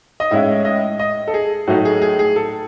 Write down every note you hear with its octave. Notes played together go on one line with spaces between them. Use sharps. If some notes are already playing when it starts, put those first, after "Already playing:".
D#5
A2 G#3 C#4 E4 E5
D#5
D#5
A4
G#4
A2 F#3 A3 D#4 F#4
G#4
G#4
G#4
A4